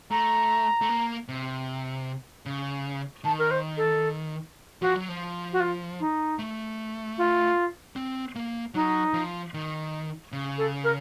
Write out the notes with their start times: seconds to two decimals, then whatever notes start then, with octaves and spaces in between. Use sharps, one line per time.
0.11 A3 A#5
0.81 A3
0.89 A#3
1.28 C3
2.46 C#3
3.25 D#3 A5
3.39 A#4
3.51 C5
3.77 A4
4.82 F3 F#4
4.96 F#3
5.08 F3
5.53 F#4
5.60 F4
6.00 D#4
6.39 A3
7.18 F4
7.96 C4
8.35 A#3
8.74 F#3 D#4
9.13 F3
9.54 D#3
10.32 C#3
10.58 A4
10.84 A#4